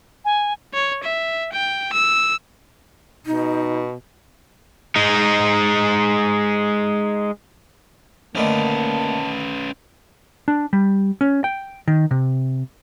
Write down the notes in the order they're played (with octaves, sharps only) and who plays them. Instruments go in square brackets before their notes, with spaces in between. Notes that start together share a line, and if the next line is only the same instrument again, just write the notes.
[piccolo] G#5
[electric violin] C#5
E5
G5
E6
[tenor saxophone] B2 [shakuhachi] D#4
[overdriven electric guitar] G#3 D#4
[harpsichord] D3 D#3 A3 [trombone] A#3 [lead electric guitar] C#4 B4 [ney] A5
[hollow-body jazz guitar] D4
G3
C#4
G5
D#3
C3